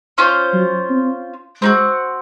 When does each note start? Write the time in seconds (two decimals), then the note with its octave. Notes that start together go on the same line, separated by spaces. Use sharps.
0.18 C#4 F4 C5
0.54 F#3
0.90 C4
1.62 G#3 C4 D#4 F#4